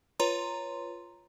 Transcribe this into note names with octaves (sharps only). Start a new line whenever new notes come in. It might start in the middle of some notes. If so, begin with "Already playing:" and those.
F4 B4 C#5 A#5 C6